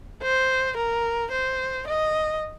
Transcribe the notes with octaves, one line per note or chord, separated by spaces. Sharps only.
C5
A#4
C5
D#5